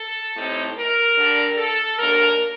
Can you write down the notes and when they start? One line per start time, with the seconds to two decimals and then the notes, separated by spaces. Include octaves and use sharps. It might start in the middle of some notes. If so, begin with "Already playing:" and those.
Already playing: A4
0.35 A2 G3 C4 D#4
0.76 A#4
1.17 D3 G3 D4
1.58 A4
1.98 D#2 D3 F#3 A#3 D4 A#4